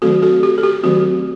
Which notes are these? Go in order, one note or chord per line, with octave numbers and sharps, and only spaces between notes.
D#3 F#3 A3 C4 F#4 A4
F#4 A4
G4
A4
G4
D#3 F#3 A3 C4 F#4